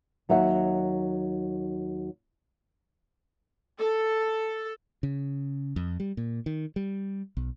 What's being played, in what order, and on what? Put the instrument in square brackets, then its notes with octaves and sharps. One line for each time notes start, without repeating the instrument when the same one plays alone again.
[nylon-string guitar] D#2 F#3 D#4 E5 F#5
[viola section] A4
[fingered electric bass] C#3
F2
G3
A#2
D#3
G3
B1